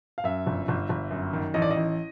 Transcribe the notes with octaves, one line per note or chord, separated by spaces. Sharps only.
F5
F#2 E5
G1
G1
G1
F#2
D#3
A1 D#5
D5
D#5
A1